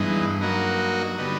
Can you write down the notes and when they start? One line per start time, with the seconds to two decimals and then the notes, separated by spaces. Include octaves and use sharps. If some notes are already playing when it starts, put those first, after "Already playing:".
Already playing: G2 E3 G#3 B3 D#4
0.41 F#3 A#3 D#4 F#4
1.18 D3 G3 B3 D#4